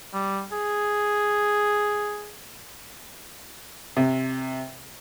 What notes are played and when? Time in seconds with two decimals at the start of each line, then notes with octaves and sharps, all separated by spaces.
0.14 G3
0.52 G#4
3.97 C3